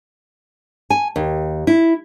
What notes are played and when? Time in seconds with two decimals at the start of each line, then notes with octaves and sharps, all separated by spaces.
0.90 G#5
1.16 D#2
1.67 E4